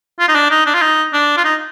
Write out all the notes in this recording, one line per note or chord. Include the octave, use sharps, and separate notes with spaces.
F4
D#4
D4
D#4
D4
F4
D#4
D4
F4
D#4